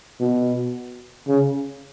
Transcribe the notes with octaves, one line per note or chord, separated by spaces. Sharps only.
B2
C#3